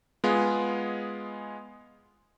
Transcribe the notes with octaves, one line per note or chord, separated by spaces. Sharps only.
G#3 B3 F4 G#4